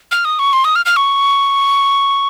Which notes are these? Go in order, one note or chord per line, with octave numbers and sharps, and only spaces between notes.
F6
D#6
C#6
C6
D#6
F6
F6
C#6